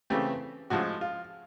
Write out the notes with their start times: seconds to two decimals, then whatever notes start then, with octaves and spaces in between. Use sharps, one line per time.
0.10 C#3 E3 A3 C4 G4
0.70 A2 F3 G#3 F#4
1.01 F4